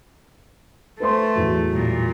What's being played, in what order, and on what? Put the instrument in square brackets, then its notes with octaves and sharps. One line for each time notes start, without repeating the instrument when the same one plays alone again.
[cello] A3 [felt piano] B4 C5 C6
[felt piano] E2 A2 F#3
[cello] A#2 G3